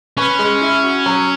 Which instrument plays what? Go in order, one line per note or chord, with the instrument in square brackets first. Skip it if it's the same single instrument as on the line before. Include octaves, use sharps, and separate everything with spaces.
[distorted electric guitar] C#4 [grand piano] B4
[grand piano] G#3
E4
F#4
F#3